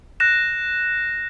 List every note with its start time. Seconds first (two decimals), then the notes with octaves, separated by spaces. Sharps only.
0.20 F#6 A#6 E7